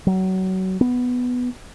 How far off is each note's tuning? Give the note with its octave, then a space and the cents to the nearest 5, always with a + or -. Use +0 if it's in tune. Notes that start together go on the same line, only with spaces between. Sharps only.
F#3 +25
B3 +5